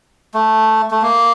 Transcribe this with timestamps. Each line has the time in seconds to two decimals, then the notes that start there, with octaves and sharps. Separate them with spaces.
0.34 A3
0.91 A3
1.02 A#3